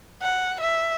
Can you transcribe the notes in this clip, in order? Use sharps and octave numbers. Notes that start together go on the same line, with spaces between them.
F#5
E5